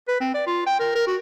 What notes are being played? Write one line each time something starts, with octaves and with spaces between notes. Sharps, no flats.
B4
C4
D5
F4
G5
A#4
A#4
F#4